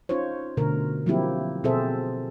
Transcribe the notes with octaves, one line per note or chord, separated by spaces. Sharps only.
C#4 D#4 F4 C5 C#5
B2 D3 A3 A#4
F3 F#3 A#3 C4 E4 G4
B2 C4 G#4 A4 C5 E5